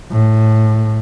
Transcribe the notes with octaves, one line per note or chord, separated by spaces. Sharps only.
A2